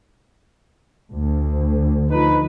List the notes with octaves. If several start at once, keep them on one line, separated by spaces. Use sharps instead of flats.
D2
F3 D#4 B4